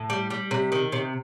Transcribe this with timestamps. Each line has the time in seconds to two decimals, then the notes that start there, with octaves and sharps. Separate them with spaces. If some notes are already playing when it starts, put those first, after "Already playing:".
Already playing: A2
0.10 G3
0.30 G3
0.51 C3
0.72 D#3
0.92 C3